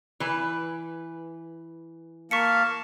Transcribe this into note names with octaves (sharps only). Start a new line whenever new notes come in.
E3 B4
A#3 F5 A5 C#6 B6 C#7